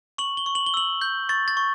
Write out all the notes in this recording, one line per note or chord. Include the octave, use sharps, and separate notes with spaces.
C#6 F#7
G7
C#6
F#7
G7
E6 F#7
G6
C#6 A6
A6
C#6